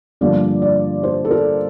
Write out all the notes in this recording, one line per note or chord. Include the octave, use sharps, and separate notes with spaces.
G2 D3 F3 A#3 D5
D5
C5
A4
A#4